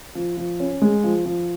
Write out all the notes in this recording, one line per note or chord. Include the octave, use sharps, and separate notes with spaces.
F3
F3
C#4
G#3
F3
F3